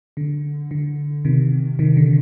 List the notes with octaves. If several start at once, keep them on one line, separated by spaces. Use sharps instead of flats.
D3
D3
C3 D#3
C3 D#3
D3